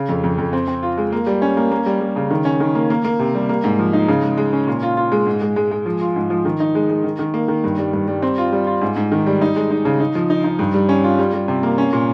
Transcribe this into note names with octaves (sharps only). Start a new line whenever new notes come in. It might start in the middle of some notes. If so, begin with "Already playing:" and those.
Already playing: C#3
F2
F2
F2
C4
C4
F4
G#3
A#3
G3
C#4
A#3
A#3
G3
G3
C#3
D#3
C#4
D#3
A#3
A#3
A#3
C3
G3
A#3
G#2
F3
D#4
C#3
G#3
G#3
C#4
A#2
F4
F4
G#3
G#2
G#3
G#3
G#3
F3
F4
G#2
F3
D#3
D#4
G#3
G#3
D#3
D#3
A#3
D#3
G2
G3
G2
G3
C4
F4
G3
F4
G#2
G#2
D#3
G3
D#4
G#3
D#4
C#3
D#4
F3
D#4
D#4
G2
G3
C#4
F4
G3
G3
C3
A#3
C#4
A#2